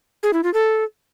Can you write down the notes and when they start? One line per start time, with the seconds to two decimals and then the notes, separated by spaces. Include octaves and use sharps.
0.23 G#4
0.33 E4
0.44 F4
0.54 A4